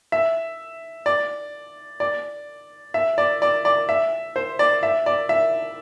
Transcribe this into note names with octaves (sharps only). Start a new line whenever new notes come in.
E5
D5
D5
E5
D5
D5
D5
E5
C5
D5
E5
D5
E5